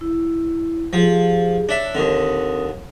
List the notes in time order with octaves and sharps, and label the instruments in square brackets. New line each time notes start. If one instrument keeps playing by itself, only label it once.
[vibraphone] E4
[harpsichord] F3 [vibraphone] G4 G#4
[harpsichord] D4 E5 [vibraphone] C#5
[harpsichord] D#2 D3 [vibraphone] C4 A#4 D#6